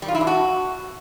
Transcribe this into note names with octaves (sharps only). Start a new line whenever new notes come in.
G3
F4
E4
D4
F#4